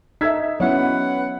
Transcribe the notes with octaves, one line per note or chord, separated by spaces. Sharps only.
D#4 A4 E5 E6 G#6 B6
F#3 B3 C#4 E4 B4 F#5